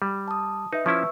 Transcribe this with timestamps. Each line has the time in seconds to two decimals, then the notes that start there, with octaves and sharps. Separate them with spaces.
0.02 G3
0.28 A5 D#6
0.73 D#4 B4 E5
0.86 F3 C#4 E4 C#6 E6